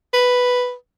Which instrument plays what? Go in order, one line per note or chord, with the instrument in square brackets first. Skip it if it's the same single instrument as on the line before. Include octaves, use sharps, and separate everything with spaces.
[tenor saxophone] B4